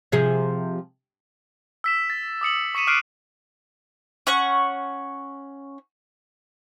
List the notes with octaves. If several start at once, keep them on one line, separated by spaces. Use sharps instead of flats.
C3 F3 G#4
E6 B6 E7
A6
D6 D#6 C#7 F#7
C#6 B6 C#7 D#7 E7
D6 F6 F#6 C7 D7 D#7
C#4 F#5 C#6